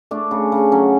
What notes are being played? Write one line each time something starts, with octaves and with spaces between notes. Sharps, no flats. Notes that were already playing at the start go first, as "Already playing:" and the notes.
A3 D4
C#3
C#3
F#3 C#4